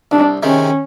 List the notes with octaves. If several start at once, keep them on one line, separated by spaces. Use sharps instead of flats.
C2 D4
C3 D#3 G#3 C#4